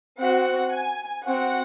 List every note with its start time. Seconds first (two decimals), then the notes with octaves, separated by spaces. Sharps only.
0.18 C4 F#4 F#5
0.72 G#5
1.24 C4 F#4 F#5